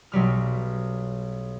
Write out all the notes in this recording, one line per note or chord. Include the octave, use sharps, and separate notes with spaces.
B1 F#3 G3 F6